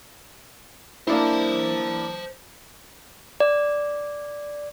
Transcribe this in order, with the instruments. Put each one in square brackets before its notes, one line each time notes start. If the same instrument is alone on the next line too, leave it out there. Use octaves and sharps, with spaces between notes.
[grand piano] A#3 D4 E4 [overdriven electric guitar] C5 A5
[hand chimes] D5